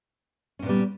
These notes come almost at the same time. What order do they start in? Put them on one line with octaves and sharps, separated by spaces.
C#4 A#2 B3 G3